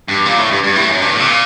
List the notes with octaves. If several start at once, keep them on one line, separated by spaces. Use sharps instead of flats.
G2
A#2
A2
G2
G2
A2
F#2
G2
A2
C3
A#2